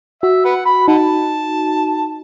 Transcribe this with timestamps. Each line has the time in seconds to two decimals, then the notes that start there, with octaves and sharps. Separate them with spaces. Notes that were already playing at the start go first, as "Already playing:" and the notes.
0.23 F#4 E5
0.45 B4 F#5
0.66 B5
0.88 D#4 F#5 A5